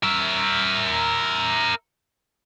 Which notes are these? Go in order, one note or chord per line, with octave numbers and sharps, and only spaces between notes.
A#4 E5